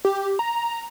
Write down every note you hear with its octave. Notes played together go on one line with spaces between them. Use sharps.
G4
A#5